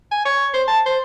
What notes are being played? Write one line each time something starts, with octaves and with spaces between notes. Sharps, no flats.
G#5
C#5
C5
A5
C5